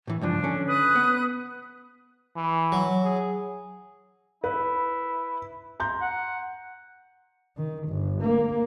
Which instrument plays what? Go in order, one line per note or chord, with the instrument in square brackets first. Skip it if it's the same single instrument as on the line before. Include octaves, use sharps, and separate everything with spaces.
[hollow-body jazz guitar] A2 E3
[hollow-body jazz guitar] C#2 G2 F3 [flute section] D4
[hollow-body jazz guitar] D3 C#4
[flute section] B4 D#6 F#6
[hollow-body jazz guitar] B3
[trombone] E3
[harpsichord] F#3
[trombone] G#4
[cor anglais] E4 [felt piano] B4
[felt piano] A#5 C6 G6
[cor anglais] F#5
[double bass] D#3
G1
A#3